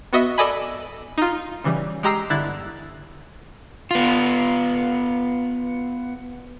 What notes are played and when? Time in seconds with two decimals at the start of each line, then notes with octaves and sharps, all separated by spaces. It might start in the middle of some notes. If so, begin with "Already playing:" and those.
0.13 B3 F#4 D#5 E5
0.38 A4 D5 D#5 G#5 B5
1.18 D#4 F4
1.64 C#3 E3 G3
2.03 G#3 G4 A#5 E6 C7
2.30 G1 D3 E4 F#6 A6
3.91 B3 F4